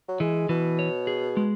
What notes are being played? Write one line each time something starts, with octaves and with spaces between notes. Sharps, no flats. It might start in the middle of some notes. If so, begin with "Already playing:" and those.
F#3
E3 G#3
B2 E3
C#5
G#4
G#3